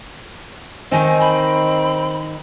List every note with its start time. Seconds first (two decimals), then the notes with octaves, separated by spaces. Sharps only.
0.92 D#3 C4 D#4 G#5
1.21 B5